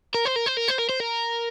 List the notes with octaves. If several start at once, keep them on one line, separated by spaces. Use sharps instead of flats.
A#4
C5
A#4
C5
A#4
C5
A#4
C5
A#4